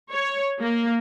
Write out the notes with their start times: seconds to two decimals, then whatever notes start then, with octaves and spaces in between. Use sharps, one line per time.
0.11 C#5
0.61 A#3